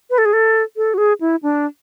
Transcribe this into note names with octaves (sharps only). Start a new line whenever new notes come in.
B4
A4
G#4
A4
A4
F#4
G#4
E4
D4